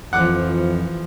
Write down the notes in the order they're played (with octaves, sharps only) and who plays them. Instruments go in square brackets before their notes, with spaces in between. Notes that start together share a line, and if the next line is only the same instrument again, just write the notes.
[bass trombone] F2 [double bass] E3 F3 [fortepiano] F#5 D6 F#6